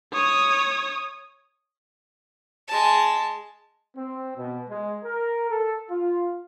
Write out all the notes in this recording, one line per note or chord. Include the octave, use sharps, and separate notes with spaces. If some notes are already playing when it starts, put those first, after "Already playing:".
C#5 D#6
G#3 A5
C4
B2
G#3
A#4
A4
F4